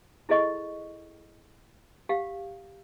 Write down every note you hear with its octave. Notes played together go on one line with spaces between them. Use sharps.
E4 G#4 A4 D#5 C#6
G4 F5 F#5